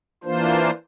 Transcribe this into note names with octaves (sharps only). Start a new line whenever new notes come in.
E3 A#3 D4 F4 C5